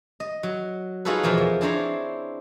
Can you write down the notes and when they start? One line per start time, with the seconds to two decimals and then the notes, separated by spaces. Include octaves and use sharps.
0.20 D#5
0.43 F#3
1.05 D#4 F4 F#4 G#4 A4 B4
1.23 E2 B2 F3 A#4 C5
1.38 F2
1.61 C4 D4 E4 C5 C#5 A#5